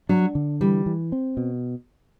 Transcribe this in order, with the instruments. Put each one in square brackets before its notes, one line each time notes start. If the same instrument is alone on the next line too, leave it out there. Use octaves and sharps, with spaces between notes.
[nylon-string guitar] F#3 [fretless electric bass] D4
[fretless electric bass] D3
[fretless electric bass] E3 [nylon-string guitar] G3
[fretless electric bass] E3
C4
B2